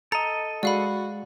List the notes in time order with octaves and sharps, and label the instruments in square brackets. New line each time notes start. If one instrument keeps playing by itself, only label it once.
[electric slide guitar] A4 D#5 [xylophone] A#5
[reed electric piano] G#3 [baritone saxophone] F#4 [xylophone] D5 F5 B5